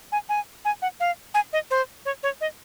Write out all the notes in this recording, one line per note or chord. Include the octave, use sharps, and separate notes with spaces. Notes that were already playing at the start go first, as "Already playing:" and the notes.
G#5
G#5
G#5
F#5
F5
G#5
D#5
C5
C#5
C#5
D#5